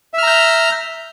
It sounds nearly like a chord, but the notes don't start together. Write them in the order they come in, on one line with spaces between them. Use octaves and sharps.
E5 F6 A#5 G6